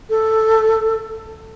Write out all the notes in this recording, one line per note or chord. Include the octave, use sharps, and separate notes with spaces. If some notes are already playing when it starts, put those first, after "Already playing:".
A4